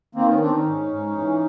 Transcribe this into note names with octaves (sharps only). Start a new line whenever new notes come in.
D#3 A#3 C4
B3 C#4
D#3 C4 D4
C#4 D#4
G#2
G#2
E3